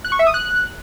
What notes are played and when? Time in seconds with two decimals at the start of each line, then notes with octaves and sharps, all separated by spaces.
0.05 F#6
0.12 C#6
0.19 E5
0.27 D#6
0.34 F#6